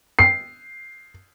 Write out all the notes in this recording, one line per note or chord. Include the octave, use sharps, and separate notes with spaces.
C7